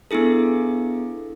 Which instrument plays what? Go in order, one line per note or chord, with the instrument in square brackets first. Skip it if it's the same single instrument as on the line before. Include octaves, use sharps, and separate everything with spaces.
[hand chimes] B3 D4 E4 G#4 A4